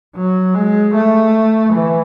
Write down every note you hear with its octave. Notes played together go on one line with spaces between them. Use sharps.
F#3
G#3
A3
E3